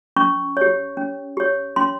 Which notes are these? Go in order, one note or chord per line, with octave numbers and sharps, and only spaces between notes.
C#4 C#6
G4 C#5
C#4
G4 C#5
C#4 C6